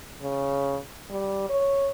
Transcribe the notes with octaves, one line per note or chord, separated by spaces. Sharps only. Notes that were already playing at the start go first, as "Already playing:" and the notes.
C#3
G3
C#5